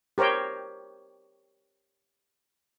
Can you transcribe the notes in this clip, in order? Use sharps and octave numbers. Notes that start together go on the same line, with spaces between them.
G4 A#4 C5 C#5 G5